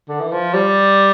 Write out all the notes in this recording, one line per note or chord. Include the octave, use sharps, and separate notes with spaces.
D3
E3
F3
G3